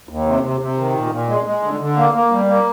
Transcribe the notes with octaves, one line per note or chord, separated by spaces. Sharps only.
D#2
C3
C3
C3
D#3
A#2
A#2
G#3
G#3
D3
D3
A#3
A#3
G3
A#3